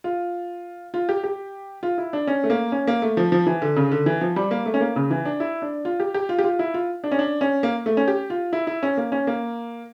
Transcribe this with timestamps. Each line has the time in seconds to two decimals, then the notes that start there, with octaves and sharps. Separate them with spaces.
0.04 F4
0.94 F4
1.09 G4
1.24 G4
1.83 F4
1.98 E4
2.13 D4
2.27 C#4
2.44 A3
2.50 A#3
2.72 C#4
2.87 A#3
3.02 A3
3.17 F3
3.32 F3
3.46 E3
3.62 D3
3.76 C#3
3.92 D3
4.06 E3
4.21 F3
4.36 G3
4.51 A#3
4.66 A3
4.74 C#4
4.81 A#3
4.96 C#3
5.10 E3
5.25 D4
5.40 E4
5.62 D4
5.85 F4
6.00 G4
6.14 G4
6.29 F4
6.39 G4
6.44 F4
6.59 E4
6.74 F4
7.04 D4
7.12 C#4
7.19 D4
7.41 C#4
7.63 A#3
7.86 A3
7.97 C#4
8.08 G4
8.30 F4
8.53 E4
8.67 E4
8.83 C#4
8.97 A#3
9.12 C#4
9.27 A#3